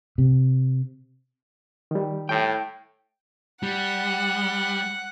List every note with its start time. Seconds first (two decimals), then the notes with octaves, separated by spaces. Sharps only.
0.18 C3
1.91 D#3 G3
2.29 A2 G5
3.63 G3 F#5